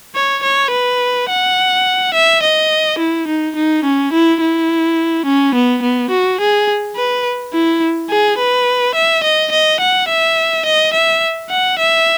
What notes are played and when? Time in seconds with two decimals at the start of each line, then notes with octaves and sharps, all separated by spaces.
0.15 C#5
0.43 C#5
0.71 B4
1.29 F#5
2.14 E5
2.43 D#5
2.99 E4
3.28 D#4
3.56 D#4
3.84 C#4
4.13 E4
4.41 E4
5.26 C#4
5.55 B3
5.82 B3
6.11 F#4
6.40 G#4
6.96 B4
7.53 E4
8.10 G#4
8.38 B4
8.95 E5
9.23 D#5
9.52 D#5
9.80 F#5
10.08 E5
10.65 D#5
10.93 E5
11.50 F#5
11.79 E5